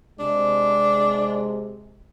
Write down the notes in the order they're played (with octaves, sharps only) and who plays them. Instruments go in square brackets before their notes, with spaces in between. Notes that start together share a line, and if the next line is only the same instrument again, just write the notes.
[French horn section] C3 G#3 [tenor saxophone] D4